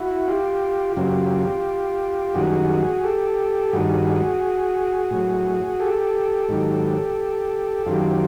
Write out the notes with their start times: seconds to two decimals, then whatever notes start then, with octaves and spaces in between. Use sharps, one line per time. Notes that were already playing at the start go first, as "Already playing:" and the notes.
Already playing: E4 F#4
0.28 F4 G4
0.96 F#2 C#3 F#3 F4 G4
2.34 F#2 D#3 G3 F#4 G#4
3.03 G4 A4
3.73 G2 D#3 G3 F#4 G#4
5.11 A2 F#3
5.80 G4 A4
6.49 G#2 D#3 F#3
7.86 F#2 D#3 F#3 F4 G4